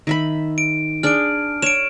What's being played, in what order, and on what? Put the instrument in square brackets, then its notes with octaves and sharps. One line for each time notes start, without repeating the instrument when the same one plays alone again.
[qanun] D#3 E5 B5
[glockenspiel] D7
[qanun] D4 G#4 [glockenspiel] F6 D7
[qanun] C#5 [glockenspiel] D7 E7